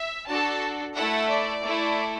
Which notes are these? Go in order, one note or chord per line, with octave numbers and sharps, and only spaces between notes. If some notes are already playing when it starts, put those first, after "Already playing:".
Already playing: E5
D4 F#4 A4 A5
A3 E4 A4 F#5
D5
A3 E4 A4